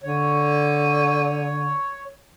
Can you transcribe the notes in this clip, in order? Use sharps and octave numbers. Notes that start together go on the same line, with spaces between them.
D3 C#5